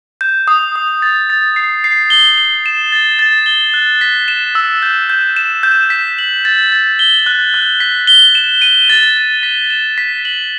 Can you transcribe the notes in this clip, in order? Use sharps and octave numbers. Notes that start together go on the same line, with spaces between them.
G6
D#6
D#6
A6
A6
C7
C7
G7
G7
E7
A6
A6
G7
F#6
B6
E7
E6
G6
G6
E7
G6
B6
F#7
A6
A6
G7
F#6
F#6
B6
G7
E7
D#7
A6
A6
B6
E7
B6
F#7